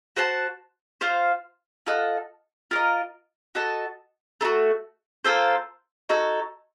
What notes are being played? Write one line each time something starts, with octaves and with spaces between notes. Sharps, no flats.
F#4 C5 F#5 A5
F4 C5 F5
F4 A4 D#5 F#5
F4 A#4 D#5
F#4 A4 D#5 A5
A3 D#4 F#4
A#3 F4 A4 C5
D#4 F#4 A4 C#5